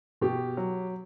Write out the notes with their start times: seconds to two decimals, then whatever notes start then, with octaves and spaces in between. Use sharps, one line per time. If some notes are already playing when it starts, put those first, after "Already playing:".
0.21 B2 G4
0.57 F#3